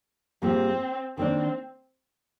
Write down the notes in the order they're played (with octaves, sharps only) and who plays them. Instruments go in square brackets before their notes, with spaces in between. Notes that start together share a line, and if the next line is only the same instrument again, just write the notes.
[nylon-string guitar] G#2 G3 A#3 F4 [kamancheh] C4
[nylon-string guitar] D#3 A#3 D4 [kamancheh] C4